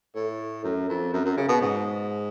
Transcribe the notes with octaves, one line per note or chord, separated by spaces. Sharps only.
A2
F#2
F2
F#2
F#2
C#3
B2
G#2